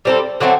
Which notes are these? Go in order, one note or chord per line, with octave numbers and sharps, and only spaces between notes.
G3 C4 F4 A4
D3 F#3 A3 C4